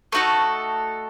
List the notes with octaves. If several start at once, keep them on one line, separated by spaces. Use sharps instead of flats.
A3 D#4 F#4 A4